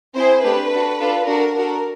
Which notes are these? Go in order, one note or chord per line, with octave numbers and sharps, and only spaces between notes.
C4 E4 G#4 C5
A3 D4 G4 B4
D4 F#4 A4
D4 F4 A4
D4 F#4 A4 A#4
D4 F#4 A4 A#4